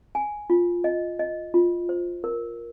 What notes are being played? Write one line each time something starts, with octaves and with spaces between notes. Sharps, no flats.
G#5
F4
D#5
D#5
F4
C5
A#4